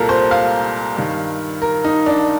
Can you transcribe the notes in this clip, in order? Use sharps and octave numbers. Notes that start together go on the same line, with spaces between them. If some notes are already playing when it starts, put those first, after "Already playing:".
Already playing: C2 A#2 A4 A#4
C5
F5
G2 D#3
A#4
D#4
D4